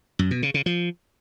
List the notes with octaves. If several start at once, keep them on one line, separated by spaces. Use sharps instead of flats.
F#2
B2
C#3
C#3
F3